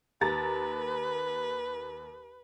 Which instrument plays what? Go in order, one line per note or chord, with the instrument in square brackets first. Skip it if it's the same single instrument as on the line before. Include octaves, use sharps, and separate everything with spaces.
[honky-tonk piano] D#2 A#5 A6 [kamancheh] B4